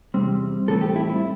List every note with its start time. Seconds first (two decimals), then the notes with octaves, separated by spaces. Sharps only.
0.14 E2 C3 G3 C4
0.68 A2 E3 G3 C4 A4
0.81 G4
0.96 E4
1.10 E4